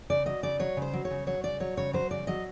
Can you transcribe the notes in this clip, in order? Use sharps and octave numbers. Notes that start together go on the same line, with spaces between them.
C#3 D5
F#3 D#5
C#3 D5
F#3 C#5
C#3
C5
F#3
C#5
C#3
F#3 C#5
C#3 D5
F#3 C#5
C#3 C#5
F#3 C5
C#3 D5
F#3 D#5